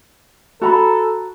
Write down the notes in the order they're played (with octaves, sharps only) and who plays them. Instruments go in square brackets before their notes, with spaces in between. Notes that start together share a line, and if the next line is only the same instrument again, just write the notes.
[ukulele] F#4 A#5 B5 [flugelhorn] A4